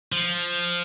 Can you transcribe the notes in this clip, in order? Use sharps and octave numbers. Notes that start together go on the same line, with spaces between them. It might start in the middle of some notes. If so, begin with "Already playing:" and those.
F3